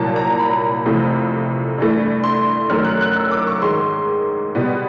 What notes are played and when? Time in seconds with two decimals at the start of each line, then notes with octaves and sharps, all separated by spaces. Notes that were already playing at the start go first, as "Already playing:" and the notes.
Already playing: C2 A#2 F#3 A5
0.16 A#5
0.39 B5
0.85 F2 C3 E3 A3
1.78 G2 E3 A3
2.24 C6
2.70 F#2 D#3 F#3 A3 F6
2.85 F#6
3.01 F#6
3.16 E6
3.31 D6
3.47 C#6
3.62 G#2 D#3 G#3 C6
4.55 B2 G3 B3